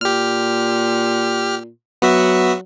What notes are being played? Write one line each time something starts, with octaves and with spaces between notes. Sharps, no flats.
A#2 G4 F6
F#3 B3 F#4 E5